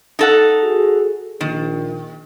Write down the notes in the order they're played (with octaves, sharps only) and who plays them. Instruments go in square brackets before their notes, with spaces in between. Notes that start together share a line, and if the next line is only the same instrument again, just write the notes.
[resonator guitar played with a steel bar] D#4 A4 F#5
[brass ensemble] F#4 G#4
[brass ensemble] A#1 [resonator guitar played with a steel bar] D#3